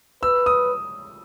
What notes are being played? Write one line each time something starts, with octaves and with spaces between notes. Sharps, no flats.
B4 E6
D#6